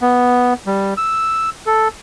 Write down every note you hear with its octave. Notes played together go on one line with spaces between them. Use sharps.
B3
G3
E6
A4